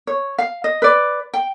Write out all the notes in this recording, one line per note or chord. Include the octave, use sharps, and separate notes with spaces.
C#5
F5
D#5
B4 D5
G5